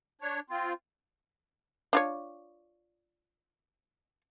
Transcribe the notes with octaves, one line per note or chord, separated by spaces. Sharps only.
D4 C#5
C4 F4
D4 F4 C#5